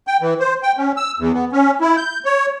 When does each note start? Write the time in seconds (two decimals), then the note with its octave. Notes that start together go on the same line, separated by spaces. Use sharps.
0.07 G5
0.22 E3
0.40 C5
0.63 G5
0.78 C#4
0.97 E6
1.19 E2
1.34 B3
1.52 C#4
1.81 E4
1.97 G6
2.25 C#5